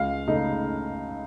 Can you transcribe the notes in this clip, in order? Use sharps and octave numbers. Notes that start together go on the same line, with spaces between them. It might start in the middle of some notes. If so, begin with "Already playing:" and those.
Already playing: C#2 F5
C#3 A3 D#4